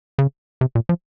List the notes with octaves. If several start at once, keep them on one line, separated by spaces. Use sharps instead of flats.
C#3
C3
A#2
F3